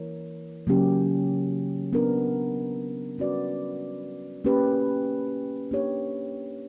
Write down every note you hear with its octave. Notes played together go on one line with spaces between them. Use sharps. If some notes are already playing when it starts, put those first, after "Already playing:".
Already playing: E3 A#3 E4 A#4 C#5
C#3 F#3 A#3 C#4 G4
B3 D4 A#4
G3 C#4 F#4 B4 D5
A#3 C#4 G4 B4
A#3 D4 G4 C#5